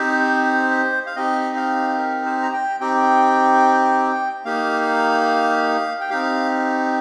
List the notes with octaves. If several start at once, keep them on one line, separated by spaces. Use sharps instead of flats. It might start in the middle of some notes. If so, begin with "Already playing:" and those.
Already playing: C4 D#4 G4 C5
F5
C4 D#4 G4 D#5
F5
A#4
C5
A#5
G5
C4 D#4 G4 G5
A#3 D#4 G4 F5
G5
C4 D#4 G4 F5